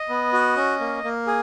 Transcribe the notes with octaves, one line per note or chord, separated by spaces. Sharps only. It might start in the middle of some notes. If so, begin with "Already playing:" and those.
Already playing: D#5
B3
F#4
C#4
A#3
A#3
G#4